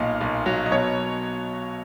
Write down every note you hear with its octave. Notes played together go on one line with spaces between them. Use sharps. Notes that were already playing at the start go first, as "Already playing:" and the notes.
Already playing: B1 A#2 D#5 F5
B1
F#3
D#5
B2 C#5